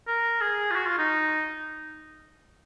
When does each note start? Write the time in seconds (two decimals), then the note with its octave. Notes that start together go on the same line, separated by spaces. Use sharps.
0.08 A#4
0.41 G#4
0.71 F4
0.75 F#4
0.87 F4
0.98 D#4